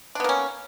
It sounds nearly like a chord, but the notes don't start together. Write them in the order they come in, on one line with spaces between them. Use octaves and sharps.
D4 B3 A#3 C#4